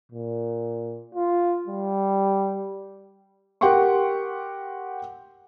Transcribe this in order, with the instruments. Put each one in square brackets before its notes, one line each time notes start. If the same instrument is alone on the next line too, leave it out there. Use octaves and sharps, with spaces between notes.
[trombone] A#2
F4
G3
[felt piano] G4 A#4 F#5 G5 C6 C#6